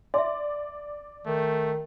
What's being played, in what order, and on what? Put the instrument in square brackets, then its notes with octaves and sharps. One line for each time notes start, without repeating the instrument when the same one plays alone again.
[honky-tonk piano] D5 [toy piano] E5 C6
[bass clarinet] D#3 [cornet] A3